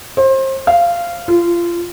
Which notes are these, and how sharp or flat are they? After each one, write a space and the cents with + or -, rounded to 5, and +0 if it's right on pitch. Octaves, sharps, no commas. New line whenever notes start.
C5 +30
F5 -15
F4 -25